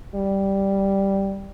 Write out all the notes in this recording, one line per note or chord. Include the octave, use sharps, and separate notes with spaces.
G3